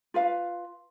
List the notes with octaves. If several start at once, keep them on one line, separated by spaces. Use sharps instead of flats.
F4 B4 F5